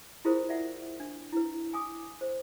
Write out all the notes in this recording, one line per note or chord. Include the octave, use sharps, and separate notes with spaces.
E4 F4 G#4 A#4 C5
D5 E5 F#5
D4
E4 B4
G#5 D6 D#6
C5